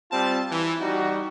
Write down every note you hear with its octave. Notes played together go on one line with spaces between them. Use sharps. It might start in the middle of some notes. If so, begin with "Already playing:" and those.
G3 C4 F4 A5
E3
G3 D#4 F#4